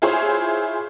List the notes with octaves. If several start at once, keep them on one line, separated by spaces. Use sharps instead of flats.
E4 F4 G#4 C5 C#5